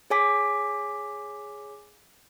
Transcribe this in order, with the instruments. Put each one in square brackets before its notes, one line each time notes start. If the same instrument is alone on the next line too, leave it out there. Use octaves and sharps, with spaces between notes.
[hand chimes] G#4 C#5 G#5 D6 B6